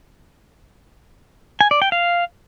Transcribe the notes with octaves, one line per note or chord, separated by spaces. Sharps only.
G#5
D5
G5
F5